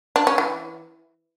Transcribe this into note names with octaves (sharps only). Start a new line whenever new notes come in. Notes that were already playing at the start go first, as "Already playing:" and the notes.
D4
C#4
E3